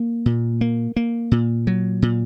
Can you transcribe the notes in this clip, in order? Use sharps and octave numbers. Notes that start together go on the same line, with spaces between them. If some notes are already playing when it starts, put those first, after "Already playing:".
Already playing: A#3
A#2
A#3
A#3
A#2
F#3
A#2